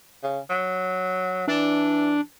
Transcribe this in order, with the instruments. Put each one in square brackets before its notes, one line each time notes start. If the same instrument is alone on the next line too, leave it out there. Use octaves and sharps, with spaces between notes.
[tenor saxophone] C#3
F#3
[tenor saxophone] E3 [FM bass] D4